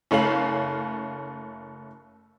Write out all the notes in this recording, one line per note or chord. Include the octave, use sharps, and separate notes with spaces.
F#1 A3 C#4 F5 F#7